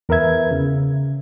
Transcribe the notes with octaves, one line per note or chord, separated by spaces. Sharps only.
E2 A#4 B4 E5 G#6
C#3